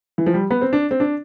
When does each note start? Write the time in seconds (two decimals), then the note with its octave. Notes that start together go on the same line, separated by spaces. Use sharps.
0.18 E3
0.26 F3
0.34 G3
0.51 B3
0.61 C4
0.73 D4
0.91 C4
1.00 D4